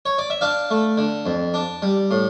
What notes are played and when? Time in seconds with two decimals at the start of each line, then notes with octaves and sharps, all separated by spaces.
0.06 C#5
0.18 D5
0.30 E5
0.41 D4 D5 F5
0.70 A3
0.97 D3
1.26 F2
1.54 D4
1.82 G3
2.11 A2